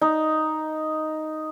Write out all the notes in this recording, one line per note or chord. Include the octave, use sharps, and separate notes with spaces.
D#4